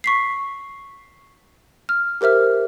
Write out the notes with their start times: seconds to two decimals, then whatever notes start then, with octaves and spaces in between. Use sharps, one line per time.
0.04 C#6 B6 C7
1.89 F6
2.21 G4 A#4 C5 E5 F6